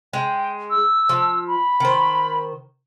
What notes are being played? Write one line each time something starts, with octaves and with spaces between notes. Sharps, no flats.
G#3 G5
E6
F3
B5
D#3 C5